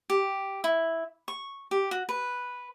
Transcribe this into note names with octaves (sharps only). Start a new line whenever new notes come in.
G4
E4
C#6
G4
F#4
B4